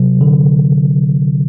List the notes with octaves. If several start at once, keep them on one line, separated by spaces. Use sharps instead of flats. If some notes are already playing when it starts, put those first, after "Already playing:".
Already playing: C3 F#3
D3